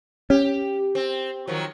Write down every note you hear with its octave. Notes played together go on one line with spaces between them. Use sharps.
C#4 G4
C4
D#3 F3 F#3